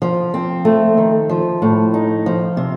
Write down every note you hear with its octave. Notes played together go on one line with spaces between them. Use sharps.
F3
C4
A3
D#3
F3
A2
D#4
F3
C3